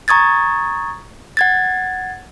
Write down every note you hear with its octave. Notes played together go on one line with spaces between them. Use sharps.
A#5 C#6 D#6 G#6 A6
F#5 G#6 A6